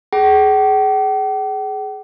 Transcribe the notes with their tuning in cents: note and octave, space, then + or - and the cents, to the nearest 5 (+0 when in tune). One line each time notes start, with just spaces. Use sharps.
G#4 +20 G5 -45